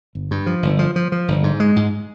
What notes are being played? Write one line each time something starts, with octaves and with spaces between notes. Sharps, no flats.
G1
G2
F3
G1
F3
F3
F3
G1
G#2
G#3
G#2